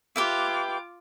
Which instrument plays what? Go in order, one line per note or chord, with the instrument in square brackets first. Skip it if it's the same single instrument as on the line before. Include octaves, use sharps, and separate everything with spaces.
[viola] F4 D6 [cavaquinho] G4 B4 E5